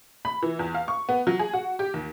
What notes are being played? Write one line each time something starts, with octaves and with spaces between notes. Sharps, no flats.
B5
E3
E2
F5
C#6
B3
F#3
G#4
F#4
G4
D#2